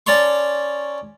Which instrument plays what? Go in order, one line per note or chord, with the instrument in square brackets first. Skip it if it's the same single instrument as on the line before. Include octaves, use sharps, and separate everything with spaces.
[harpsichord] C#4 D5 A5 A#5 C6 C#6